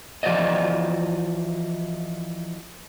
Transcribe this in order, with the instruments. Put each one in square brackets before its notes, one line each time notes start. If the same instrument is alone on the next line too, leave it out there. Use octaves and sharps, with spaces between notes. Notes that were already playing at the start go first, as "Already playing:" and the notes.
[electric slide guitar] E3 F3 F#4 C5 D5 D#5